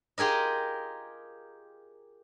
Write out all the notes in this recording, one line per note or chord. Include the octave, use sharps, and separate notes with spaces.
F4 G4 G#4 A#4 D#5